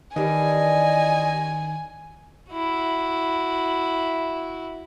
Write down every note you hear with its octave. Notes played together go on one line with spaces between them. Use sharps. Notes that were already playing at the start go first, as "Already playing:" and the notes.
D#3 E3 G3 D4 D#5 G#5
E4 F#4